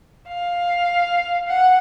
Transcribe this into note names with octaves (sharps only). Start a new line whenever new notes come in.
F5
F#5